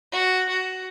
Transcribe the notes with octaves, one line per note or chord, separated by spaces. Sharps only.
F#4
F#4